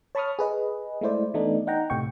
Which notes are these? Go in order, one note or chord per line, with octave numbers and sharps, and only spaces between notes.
C#5 A5 B5 C#6 D#6 F6
G#4 B4 D#5
G#3 A3 E4 C5 D5
E3 A3 B3 D4 D#4
D#4 F#5 G5 A#5
A2 C3 G5 C#6